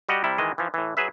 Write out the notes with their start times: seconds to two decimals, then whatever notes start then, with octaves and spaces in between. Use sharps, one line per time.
0.09 G3 F#4 G4 D#5 F#5
0.24 C3 G3 E4
0.38 D#3 E3 G#3 D#5
0.58 E3 F3
0.74 A2 E3
0.97 F#3 G#4 B4 E5